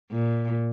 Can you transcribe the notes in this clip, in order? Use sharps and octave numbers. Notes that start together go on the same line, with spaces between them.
A#2